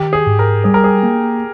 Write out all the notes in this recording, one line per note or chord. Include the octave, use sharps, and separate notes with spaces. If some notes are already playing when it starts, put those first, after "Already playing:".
Already playing: D#3 G4
G#4
G#2
A#4
G3 G#4
A#4
G#4
A#3